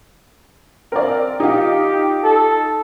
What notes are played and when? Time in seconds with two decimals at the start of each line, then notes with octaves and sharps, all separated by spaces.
0.92 C4 A#4 D5
1.40 D#4 F4 G4
2.24 A4